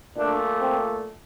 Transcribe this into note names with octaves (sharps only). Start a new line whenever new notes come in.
A#2 A3 D4
C4